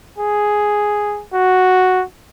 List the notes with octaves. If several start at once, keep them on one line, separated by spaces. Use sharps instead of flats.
G#4
F#4